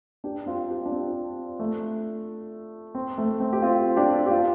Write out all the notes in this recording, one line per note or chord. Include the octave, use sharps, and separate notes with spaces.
D4 G4
C4 F4
G4
F4
D4
C4
A3
C4
A3
C4
G4
C4 F4
D4 G4
G4
C4 F4